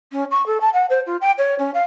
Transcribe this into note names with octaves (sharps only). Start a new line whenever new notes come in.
C#4
C#6
A4
A5
F#5
C5
F4
G5
C#5
C#4
F5